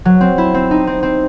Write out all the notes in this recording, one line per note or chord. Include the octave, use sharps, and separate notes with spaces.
F#3
C4
E4
C4
D#4
C4
C4